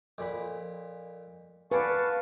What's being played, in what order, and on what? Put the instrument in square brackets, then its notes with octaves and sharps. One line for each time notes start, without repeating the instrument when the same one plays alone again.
[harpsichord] F2 A#2 B5
[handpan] B4 [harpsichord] D5 F#5 G#5 [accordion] F5 A5 C#6